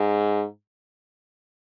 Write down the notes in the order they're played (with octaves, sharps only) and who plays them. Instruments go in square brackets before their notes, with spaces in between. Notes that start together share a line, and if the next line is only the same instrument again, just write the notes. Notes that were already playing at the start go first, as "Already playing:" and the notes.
Already playing: [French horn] G#2